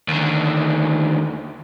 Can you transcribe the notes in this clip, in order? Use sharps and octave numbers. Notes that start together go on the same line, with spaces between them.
D#2 D3